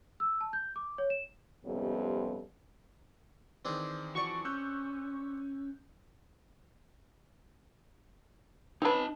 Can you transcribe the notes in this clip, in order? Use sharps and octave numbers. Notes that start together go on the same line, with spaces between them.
E6
A5
G6
D6
C#5
E7
F2 G#2 C3 G3 B3 C#4
D#3 E3 C4 D4 G#4
E3 F3 F#4 D5 C#6
C#4 E6 F#6 G6
C4 C#4 D#4 B4 A5